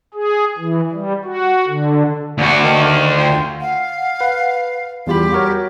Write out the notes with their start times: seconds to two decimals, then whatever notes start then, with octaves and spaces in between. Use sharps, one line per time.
0.14 G#4
0.58 E3
0.93 G3
1.24 F#4
1.67 D3
2.38 D2 D3 A#3 F#4
2.63 D#3
3.18 F4 G5 C6
3.61 F5 F#5
4.21 B4
5.07 E2 G3 F4 G4 B5
5.33 F#4 A#4 C#5